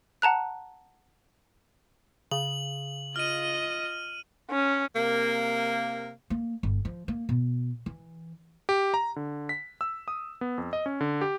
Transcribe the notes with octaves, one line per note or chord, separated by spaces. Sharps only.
F#5 A5 A#5 F#6
C#3 F#7
F4 D#5 F6 D#7
C#4
C3 A#3
A#3
G1
F3
A#3
B2
E3
G4
A#5
D3
B6
E6
D#6
B3
F2
D#5
C#4
D3
G4